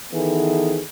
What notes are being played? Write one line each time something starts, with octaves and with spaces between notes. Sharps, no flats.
D#3 E3 B3 G#4 A4